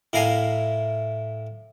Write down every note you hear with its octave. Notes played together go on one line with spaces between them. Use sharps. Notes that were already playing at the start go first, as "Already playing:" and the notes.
A2 E4 A#4 F5 G#5 C6